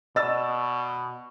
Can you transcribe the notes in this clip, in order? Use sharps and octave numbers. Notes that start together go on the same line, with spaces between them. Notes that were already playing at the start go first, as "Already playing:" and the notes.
B2 D5 D#5 E6 A6